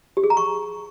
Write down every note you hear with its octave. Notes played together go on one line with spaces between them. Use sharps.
G4
G#4
A#5
C#6